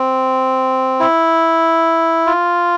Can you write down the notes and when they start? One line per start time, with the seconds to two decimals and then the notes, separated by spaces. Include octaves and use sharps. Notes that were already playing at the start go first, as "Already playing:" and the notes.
Already playing: C4
1.00 E4
2.26 F4